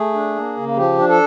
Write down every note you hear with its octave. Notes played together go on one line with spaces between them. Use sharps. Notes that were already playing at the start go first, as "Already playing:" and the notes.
Already playing: A3 G#4
D4
A#3
C#3
F3 G4
D4
A4